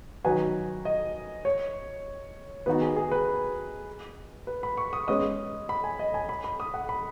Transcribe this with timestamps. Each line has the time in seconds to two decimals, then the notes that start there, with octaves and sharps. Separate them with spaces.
0.24 D#3 F#3 D#4 F#4 B4 G#5
0.85 D#5
1.45 C#5
2.66 D#3 B3 D#4 F#4 B4
2.81 G#4
2.96 G#4
3.11 B4
4.47 B4
4.63 B5
4.77 C#6
4.93 D#6
5.08 G#3 C#4 B4 D#5 D#6
5.69 B5
5.84 G#5
5.99 D#5
6.14 G#5
6.29 B5
6.44 B5
6.60 D#6
6.74 F#5
6.89 B5